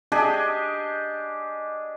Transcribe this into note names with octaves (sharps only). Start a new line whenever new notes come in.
D4 G4 G#4 D#5